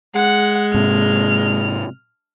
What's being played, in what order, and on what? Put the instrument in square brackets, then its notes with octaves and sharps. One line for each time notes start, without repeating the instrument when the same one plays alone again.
[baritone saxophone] G#3 [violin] F#5
[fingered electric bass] G#2 C3 [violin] F6